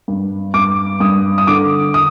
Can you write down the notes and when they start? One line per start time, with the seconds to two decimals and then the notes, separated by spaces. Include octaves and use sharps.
0.08 G2
0.54 G2 D6
1.00 G2 D#6
1.38 D#6
1.47 D3 D6
1.94 D#6